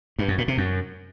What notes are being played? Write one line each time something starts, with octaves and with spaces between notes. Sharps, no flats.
G2
F#2
A#2
C3
F#2